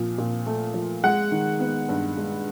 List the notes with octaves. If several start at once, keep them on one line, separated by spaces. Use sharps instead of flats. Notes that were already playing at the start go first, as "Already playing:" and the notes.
Already playing: A#2 F3
A#2
A3
F3
G#3 F#5
D#3
B3
G2
G#3